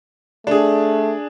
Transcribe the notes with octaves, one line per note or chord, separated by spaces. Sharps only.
A3 D4 G#4